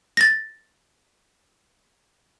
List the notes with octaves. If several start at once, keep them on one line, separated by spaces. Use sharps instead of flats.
A6 A#6